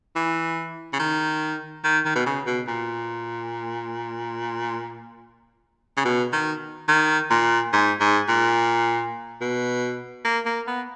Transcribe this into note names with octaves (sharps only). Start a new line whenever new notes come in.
E3
C#3
D#3
D#3
D#3
B2
C#3
B2
A#2
C#3
B2
D#3
D#3
A#2
G#2
G#2
A#2
B2
A#3
A#3
B3